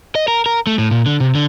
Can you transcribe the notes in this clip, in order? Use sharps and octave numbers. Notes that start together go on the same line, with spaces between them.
D#5
A#4
A#4
A3
A2
A#2
D3
C3
D3